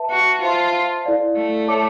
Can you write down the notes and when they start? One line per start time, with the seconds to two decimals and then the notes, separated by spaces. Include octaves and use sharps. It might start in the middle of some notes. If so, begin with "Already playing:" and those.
Already playing: B4 E5 A5
0.10 F#4
0.42 F4 C5 E5 A5 C6
1.05 E4 A4 D5 F5
1.37 A3
1.68 A4 C#5 E5 A5 D6